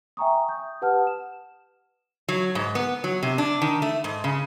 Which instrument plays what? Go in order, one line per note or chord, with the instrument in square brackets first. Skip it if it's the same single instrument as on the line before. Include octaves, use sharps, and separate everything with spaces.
[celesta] E5 G5 G#5 A#5 C#6 D#6
D#6 G6
G4 B4 F#5 A5 D#6 F6
E7
[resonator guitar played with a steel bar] F#3
G#2
B3
F#3
C3
D4
D#3
A3
G#2
C#3